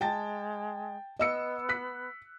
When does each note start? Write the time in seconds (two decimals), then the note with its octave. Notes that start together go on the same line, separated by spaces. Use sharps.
0.01 G#3 G5 A5 A6
1.19 B3 D#5 E6 C#7
1.69 F#6 B6